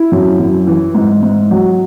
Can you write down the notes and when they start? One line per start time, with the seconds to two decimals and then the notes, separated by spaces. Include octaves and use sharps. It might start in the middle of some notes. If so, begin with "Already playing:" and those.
Already playing: E4
0.12 F#2
0.40 F#2
0.67 E3
0.95 G#2
1.23 G#2
1.51 F#3